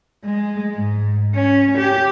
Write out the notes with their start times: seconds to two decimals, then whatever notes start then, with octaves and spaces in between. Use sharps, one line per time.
0.24 G#3
0.75 G#2
1.35 C#4
1.78 G4